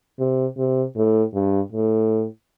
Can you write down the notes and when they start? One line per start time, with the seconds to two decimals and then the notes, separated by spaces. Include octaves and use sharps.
0.19 C3
0.57 C3
0.96 A2
1.34 G2
1.72 A2